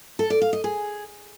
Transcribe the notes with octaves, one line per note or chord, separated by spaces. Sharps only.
A4
D5
F5
D#5
G#4